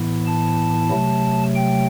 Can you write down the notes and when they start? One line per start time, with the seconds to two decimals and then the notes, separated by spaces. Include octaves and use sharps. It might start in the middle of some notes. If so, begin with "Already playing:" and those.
Already playing: A2 E3 B3 E4
0.26 A5
0.91 C3 F#3 A3
1.55 G5